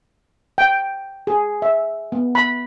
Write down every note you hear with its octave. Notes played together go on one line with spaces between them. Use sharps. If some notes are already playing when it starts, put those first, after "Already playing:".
G5
G#4
E5
B3
B5